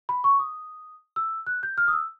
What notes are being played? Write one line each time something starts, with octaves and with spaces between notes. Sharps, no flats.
B5
C#6
D#6
E6
F#6
G6
F6
D#6
E6